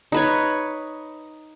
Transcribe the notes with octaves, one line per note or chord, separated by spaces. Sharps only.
D#4 B4 C#5